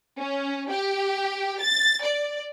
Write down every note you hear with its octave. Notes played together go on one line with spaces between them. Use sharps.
C#4
G4
A6
D5